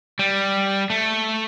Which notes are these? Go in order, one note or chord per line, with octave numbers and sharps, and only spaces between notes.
G3
A3